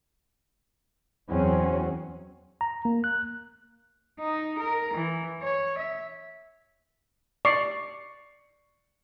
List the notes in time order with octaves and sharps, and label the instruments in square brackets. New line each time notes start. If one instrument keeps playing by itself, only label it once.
[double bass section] E2 F#3 C4 C#4
[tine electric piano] A#5
A#3
F#6
[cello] D#4
A#4
E3
C#5
E5
[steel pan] D5 [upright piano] C#6 C7